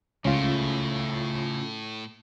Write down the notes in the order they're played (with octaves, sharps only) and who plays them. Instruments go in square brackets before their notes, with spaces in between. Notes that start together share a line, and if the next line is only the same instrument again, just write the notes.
[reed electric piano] C#2 [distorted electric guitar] A2 [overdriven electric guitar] C#3 A3 [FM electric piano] C#4 F4